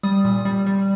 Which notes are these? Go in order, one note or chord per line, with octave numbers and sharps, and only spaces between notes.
G3 D#6
A#2
G3
G3